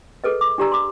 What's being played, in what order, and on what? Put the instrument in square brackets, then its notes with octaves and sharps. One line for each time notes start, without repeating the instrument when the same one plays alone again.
[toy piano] G#4 A4 B4 D#5
D6
D4 G4 D5 A#5 E6
C6 D6